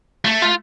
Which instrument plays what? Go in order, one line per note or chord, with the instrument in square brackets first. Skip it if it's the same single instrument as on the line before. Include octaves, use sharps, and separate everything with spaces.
[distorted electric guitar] A3
[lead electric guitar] F4